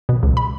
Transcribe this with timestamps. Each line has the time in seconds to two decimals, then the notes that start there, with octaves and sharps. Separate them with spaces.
0.09 B2
0.23 C#2
0.37 B5